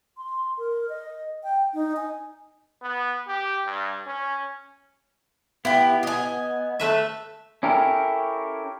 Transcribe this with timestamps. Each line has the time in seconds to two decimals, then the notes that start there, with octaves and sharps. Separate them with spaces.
0.17 C6
0.58 A#4
0.89 D#5
1.44 G5
1.74 D#4
1.97 G#5
2.82 B3
3.28 G4
3.66 G2
4.07 C#4
5.65 B3 E4 G4
6.03 D#5 G#5
6.80 A3 B4 E5
7.63 C#4 E4 G4 A4 A#4